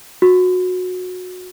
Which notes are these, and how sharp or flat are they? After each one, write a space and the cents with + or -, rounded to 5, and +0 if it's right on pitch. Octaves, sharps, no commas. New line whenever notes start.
F#4 -20